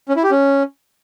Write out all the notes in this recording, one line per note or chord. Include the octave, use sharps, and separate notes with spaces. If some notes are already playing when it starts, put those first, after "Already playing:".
C#4
E4
G4
C#4